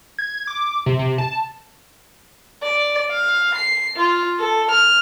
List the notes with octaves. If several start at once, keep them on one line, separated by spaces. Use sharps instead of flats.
G#6
D6
C3
C3
A5
D5
F5
C7
F4
A4
F6